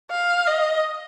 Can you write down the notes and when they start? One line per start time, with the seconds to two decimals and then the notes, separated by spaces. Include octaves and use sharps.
0.11 F5
0.47 D#5